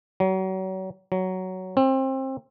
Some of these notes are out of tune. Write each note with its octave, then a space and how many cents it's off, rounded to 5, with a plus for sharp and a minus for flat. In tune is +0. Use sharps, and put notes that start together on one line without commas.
F#3 +35
F#3 +10
C4 +25